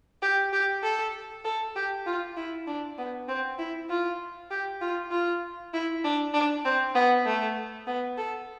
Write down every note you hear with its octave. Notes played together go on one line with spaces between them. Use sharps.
G4
G4
A4
A4
G4
F4
E4
D4
B3
C4
E4
F4
G4
F4
F4
E4
D4
D4
C4
B3
A3
B3
A4